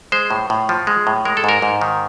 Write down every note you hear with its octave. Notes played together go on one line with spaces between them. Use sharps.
G#3 C5
A2
A2
F3
G#3
A2
G#3 A#4
A4
G#2 A#4
G#2
D#3